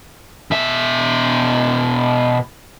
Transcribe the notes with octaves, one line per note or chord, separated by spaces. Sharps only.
B2 E5